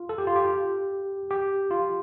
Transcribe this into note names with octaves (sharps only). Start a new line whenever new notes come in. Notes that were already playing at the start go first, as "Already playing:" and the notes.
Already playing: F4
A4
G4
F4
G4
G4
F4